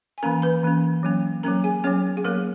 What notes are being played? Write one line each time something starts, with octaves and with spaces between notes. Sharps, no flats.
G#5
E3 A#3 C#4 A#4 A#5
B4 B5
E3 A#3 C#4
F#3 A#3 C#4
F#3 A#3 C#4 A#4 A#5
G#4 G#5
F#3 B3 C#4 C#5
G#4
F#3 A#3 B3 A#4